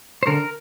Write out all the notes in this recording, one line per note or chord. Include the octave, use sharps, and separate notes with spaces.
C5
D3 A#4